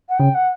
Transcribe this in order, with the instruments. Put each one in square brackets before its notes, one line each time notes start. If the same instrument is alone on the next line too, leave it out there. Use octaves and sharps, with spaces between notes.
[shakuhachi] F#5
[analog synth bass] C#3 [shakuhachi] G5
[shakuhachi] F#5